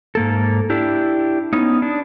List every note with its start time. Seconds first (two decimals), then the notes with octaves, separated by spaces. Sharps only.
0.15 G#2 A#3 A4
0.70 D4 E4 G4
1.53 B3 C#4 D#4
1.82 D4